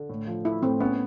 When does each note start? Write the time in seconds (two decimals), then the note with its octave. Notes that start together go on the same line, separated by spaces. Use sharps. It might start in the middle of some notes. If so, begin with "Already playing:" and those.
Already playing: D3
0.10 A2
0.27 F3
0.45 A3 E4
0.63 A2 C4
0.80 B3 C#4